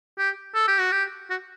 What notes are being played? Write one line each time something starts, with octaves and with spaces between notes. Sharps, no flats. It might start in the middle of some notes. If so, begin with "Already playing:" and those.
G4
A4
G4
F#4
G4
F#4